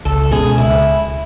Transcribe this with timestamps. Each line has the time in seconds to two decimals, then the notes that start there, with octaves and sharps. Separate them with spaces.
0.05 C#2 A4
0.31 B2 G#3 C#4 G#4
0.58 C#2 E4